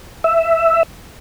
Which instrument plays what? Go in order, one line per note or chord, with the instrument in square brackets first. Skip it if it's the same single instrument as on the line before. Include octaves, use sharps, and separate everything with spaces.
[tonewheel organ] E5